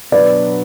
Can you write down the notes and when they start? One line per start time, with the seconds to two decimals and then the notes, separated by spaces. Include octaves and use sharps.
0.12 B2 F#3 B3 D4 B4 D5